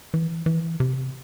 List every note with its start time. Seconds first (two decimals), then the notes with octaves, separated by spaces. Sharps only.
0.14 E3
0.46 E3
0.80 C3